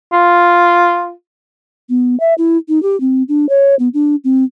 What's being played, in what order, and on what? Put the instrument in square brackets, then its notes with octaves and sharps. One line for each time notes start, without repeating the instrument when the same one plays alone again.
[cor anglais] F4
[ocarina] B3
E5
E4
D#4
G4
C4
D4
C#5
B3
D4
C4